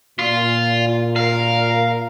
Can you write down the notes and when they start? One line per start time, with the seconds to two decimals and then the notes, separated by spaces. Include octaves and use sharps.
0.19 A#2 F4
1.16 A#4 F5